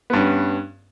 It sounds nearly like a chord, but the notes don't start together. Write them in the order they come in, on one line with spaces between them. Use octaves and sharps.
B3 G2 C#4